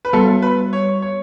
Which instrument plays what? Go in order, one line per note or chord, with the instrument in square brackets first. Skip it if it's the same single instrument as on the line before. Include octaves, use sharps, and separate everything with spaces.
[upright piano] B4
[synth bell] G3 B3 F#4 [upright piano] A4
[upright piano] B4
C#5
C#5